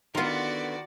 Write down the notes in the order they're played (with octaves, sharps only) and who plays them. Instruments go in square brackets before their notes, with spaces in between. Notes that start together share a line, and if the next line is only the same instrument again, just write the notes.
[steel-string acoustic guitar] D3 B3 [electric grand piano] D#3 C6 [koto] F4 A#4 [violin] F#4 D5